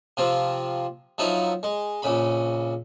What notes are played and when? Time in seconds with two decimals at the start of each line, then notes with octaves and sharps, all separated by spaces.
0.17 C3 F3 C4
1.18 F3 F#3 D#4 E4
1.63 G#3
2.02 A#1 C#3 B5